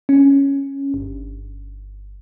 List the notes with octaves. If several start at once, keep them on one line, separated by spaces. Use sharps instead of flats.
C#4
G1